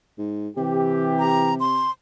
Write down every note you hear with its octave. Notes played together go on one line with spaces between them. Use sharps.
G#2
C3 E3 G4
A#5
C6